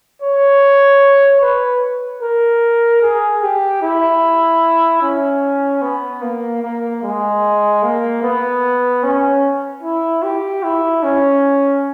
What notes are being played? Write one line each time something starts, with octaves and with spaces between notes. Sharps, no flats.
C#5
B4
A#4
G#4
G4
E4
C#4
B3
A#3
A#3
G#3
A#3
B3
C#4
E4
G4
E4
C#4